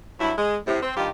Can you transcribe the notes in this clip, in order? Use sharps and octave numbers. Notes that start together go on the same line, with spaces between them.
G2 F#3 E4
G#3
A2 C3
C4
G2 D#3 F4 G4